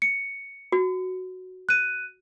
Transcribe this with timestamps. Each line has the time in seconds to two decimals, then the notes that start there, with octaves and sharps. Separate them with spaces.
0.02 C#7
0.72 F#4
1.69 F#6 D#7